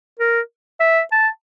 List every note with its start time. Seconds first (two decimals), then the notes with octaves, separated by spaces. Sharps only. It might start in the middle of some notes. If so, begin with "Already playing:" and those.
0.20 A#4
0.80 E5
1.12 A5